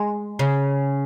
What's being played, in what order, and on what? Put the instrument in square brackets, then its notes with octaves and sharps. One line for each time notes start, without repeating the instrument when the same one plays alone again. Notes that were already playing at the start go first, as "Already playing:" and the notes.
Already playing: [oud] G#3
C#3